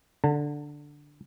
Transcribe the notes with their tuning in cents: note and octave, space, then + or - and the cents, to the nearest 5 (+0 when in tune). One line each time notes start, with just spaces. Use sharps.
D3 +0 A5 +40